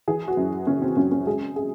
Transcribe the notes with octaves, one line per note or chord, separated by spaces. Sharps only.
E3 G#4
F#4
F#2
C#3 C#4
C4
F#2 C#4
C#4
G#3 G#4
G#4